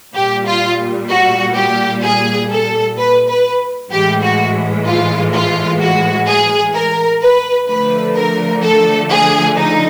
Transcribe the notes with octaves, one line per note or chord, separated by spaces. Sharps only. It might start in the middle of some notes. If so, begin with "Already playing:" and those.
A#2 G3 G4
F4
F#4
G4
G#4
A4
B4
B4
A2 E3 G#3 G4
F#4
F4
F4
F#4
G#4
A#4
B4
D3 F3 A3 B4
A#4
A4
G#4
D#4